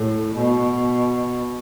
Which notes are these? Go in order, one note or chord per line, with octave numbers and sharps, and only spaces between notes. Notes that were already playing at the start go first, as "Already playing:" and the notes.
Already playing: A2
B2